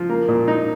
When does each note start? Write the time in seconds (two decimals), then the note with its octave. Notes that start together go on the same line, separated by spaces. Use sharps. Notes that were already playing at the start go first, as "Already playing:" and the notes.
Already playing: F3
0.09 A#3
0.28 A#2
0.48 D#4